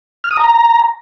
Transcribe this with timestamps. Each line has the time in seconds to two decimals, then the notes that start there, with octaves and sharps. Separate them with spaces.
0.24 F6
0.31 D#6
0.37 A#5